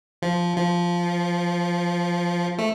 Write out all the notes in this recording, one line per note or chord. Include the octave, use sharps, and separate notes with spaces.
F3
F3
A3